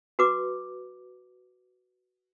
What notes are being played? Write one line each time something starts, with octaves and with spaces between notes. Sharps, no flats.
F#4 B4 D6